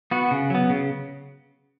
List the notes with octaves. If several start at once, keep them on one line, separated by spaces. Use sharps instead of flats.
B3 F#4
C#3
F#3 B3
C#3